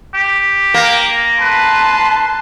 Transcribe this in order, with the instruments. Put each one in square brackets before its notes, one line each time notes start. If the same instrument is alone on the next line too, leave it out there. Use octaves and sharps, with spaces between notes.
[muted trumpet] G4
[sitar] A#3
[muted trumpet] B4 [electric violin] A5 C6